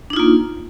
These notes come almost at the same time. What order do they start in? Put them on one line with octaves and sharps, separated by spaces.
D4 D#4 F4 A#3